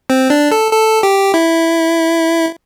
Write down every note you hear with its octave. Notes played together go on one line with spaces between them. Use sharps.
C4
D4
A4
A4
G4
E4